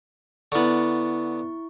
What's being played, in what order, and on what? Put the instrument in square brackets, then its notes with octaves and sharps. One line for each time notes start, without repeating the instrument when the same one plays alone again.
[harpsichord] D3 B3 [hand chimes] E4 C#6